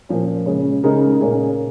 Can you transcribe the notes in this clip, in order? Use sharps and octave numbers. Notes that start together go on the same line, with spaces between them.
A#2 F3 C#4
C#3 G#3 C#4
C#3 G#3 D#4 A#4
A#2 A#3 C#4 G#4